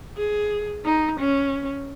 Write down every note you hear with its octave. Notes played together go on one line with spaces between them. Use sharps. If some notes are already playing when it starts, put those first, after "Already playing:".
G#4
D#4
C#4